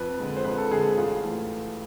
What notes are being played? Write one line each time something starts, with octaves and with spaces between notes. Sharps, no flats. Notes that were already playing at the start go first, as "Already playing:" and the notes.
Already playing: F2 B4
D3 G#3
C5
F2 B4
A4
D3 G#3 G#4
A4
A1 F4
E3 A3